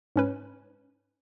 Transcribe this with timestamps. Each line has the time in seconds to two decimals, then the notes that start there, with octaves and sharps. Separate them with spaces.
0.16 G#2 C#4 B4